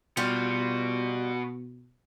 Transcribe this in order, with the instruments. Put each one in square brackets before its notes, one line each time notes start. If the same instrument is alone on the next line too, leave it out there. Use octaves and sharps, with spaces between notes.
[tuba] B2 [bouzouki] G3 F4 [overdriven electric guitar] B3 F#4